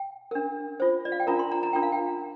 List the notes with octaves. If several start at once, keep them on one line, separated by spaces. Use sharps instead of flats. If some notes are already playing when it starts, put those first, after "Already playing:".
Already playing: G5
D4 A#4
F4 C5
D5
F5
G5
D4 F4 A#4 A#5
C6
A#5
A#5
D4 F4 A#4 G5
F5
G5